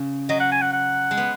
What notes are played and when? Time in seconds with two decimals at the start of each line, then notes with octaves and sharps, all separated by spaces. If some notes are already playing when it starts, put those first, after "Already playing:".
Already playing: C#3
0.29 F#3 D#5
0.40 F#5
0.52 G#5
0.62 F#5
0.73 F#5
1.11 G#3
1.17 B3